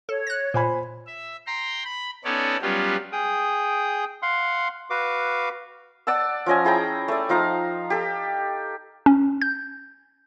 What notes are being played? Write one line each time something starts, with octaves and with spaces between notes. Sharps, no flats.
A4 C#5
F#6 A#6
A#2 C5 G#5 B5
E5
G5 A#5 C6
B5
B3 C#4 D#4 A4 C#5 D5
F#3 G3 B3 C#4 F4 G4
G#4 G5 D#6
F5 F#5 C6
F#4 B4 F5 D6
D5 F#5 A5 E6
F3 C#4 D#5 G#5
E4 G#4 G5 A#5
A3 D5
F3 D#4 F5 A#5
G4 A4
C#4
G6